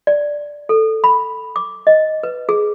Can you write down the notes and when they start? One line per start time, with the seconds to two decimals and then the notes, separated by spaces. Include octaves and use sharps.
0.07 D5
0.69 A4
1.04 B5
1.56 D6
1.87 D#5
2.23 B4
2.49 G#4